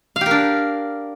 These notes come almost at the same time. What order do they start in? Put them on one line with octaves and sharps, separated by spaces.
F5 G4 A#4 D4